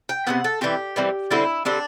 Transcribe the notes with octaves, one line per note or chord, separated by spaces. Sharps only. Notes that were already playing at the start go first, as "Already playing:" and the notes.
G5
C3 E3 B3 F#5
A4
E3 G3 C4 G4
E3 G3 C4
D3 G3 C4 E4
D3 G3 C4 D4